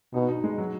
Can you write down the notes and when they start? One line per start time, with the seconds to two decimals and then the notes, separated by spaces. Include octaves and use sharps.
0.14 B2 D#4
0.28 D#4
0.44 G#3
0.58 F#3